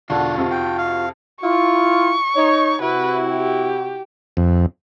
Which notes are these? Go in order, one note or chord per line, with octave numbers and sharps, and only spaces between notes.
E1 D3 D4 F4 F#4 F#5
F2 C3
G5
F5
E4 F4 C#6
D#4 C#5
C3 E4 F#4 B4
G4
F2